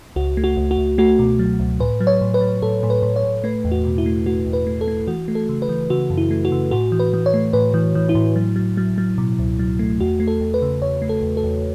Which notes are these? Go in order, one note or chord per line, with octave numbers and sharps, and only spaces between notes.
C#2 F#4
A3
F#4
C#2
F#4
C#2
A3 F#4
B2
F#3
C#2
A2 B4
F#3
C#5
A2
B4
F#3
A2 A4
A2
B4
A2
C#5
A2
A3 B4
E2
F#4
B2
E4
A3
A3 F#4
E2
B4
A3
A4
A3
E3 F#4
A3
A4
C#3
B4
E3
C#3 F#4
F#2
E4
A3
F#4
C#3
A2 F#4
E3
B4
E3
C#5
A3
A2 B4
E3
E3
E4
A2
F#3
F#3
F#3
F#3
B2
C#2
F#3
A3
E2 F#4
A3
A4
E2
B4
C#3
E2 C#5
A3
A4
E2
A4
E2